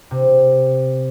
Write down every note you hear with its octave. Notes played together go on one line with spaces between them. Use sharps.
C3